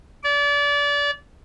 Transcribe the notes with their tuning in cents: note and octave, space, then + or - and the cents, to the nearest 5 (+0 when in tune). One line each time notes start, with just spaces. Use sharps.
D5 -30